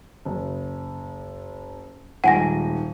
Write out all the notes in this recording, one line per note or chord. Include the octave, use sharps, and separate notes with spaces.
F#1
D#1 G#2 F#5 G#5 A#6 D#7